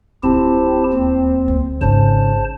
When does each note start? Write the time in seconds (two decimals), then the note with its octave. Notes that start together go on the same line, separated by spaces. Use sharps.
0.23 D1 C4 E4 F4 G4 A5
0.94 D#2
1.48 D2
1.81 G#1 C#3 D#4 C5 A5